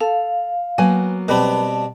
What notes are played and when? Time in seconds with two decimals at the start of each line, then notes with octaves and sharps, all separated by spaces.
0.01 A4 F5
0.78 F#3 A#3 B3 B4 G#5
1.28 B2 G3 C4 B4 A5 B5